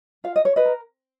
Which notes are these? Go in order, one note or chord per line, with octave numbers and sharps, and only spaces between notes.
F4 F5
D#5
C#5
B4 D#5
A#4